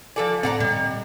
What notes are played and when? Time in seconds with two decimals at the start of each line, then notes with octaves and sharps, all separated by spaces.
0.16 F3 A4 D5 G#5
0.43 A2 D3 C4 D5 F#5 A#5
0.60 A#2 G3 D#5